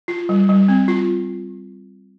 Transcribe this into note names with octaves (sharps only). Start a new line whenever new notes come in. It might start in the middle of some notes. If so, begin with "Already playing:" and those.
F4
G3
G3
C4
F4